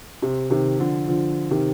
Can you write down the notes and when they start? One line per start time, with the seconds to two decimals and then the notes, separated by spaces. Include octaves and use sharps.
0.22 C3
0.50 C3 D#3
0.80 D3 F3
1.08 D3 F3
1.51 C3 D#3